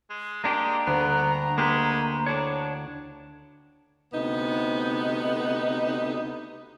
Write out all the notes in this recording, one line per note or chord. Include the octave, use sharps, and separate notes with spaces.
G#3
G#3 A#3 D4 G4 A#5
D2 B3
G#3 A#3 G4 B4
A2 D4 C#5
D2 C3 B3 D#4